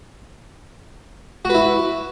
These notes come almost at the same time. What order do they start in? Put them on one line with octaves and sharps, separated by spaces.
F#4 B4 E4